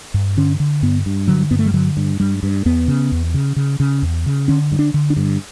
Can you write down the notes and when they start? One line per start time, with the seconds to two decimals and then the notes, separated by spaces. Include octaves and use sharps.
0.14 G2
0.37 D3 C#4
0.60 D3
0.82 G2 B3
1.06 G2
1.28 D3 F#3
1.51 G2 B3
1.59 A3
1.66 G3
1.74 D3 F#3
1.97 G2
2.20 G2 G3
2.43 G2
2.65 E2 B3
2.88 C#3
3.12 E2
3.34 C#3
3.56 C#3
3.80 C#3
4.02 E2
4.26 C#3
4.48 D3 C#4
4.72 G2
4.79 D4
4.94 D3
5.10 D4
5.17 G2